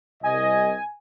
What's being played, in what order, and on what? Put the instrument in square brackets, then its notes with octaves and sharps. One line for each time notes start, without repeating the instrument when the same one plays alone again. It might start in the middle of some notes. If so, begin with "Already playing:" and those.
[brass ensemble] C2 D#5 [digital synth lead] G#5